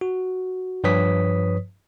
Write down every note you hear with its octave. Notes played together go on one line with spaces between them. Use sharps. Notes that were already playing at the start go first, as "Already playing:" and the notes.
F#4
G2 F3 B4 C#5 D#6 B6